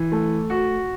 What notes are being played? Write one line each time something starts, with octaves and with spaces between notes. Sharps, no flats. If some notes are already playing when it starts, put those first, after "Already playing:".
Already playing: E3
A3
F#4